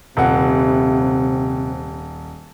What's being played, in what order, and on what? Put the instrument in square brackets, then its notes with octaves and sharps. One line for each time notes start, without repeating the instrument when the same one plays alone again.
[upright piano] D#1 F#5 [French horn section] C3